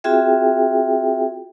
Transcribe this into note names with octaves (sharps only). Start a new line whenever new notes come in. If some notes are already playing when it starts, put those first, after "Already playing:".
C4 F4 F#4 G#4 E5 G5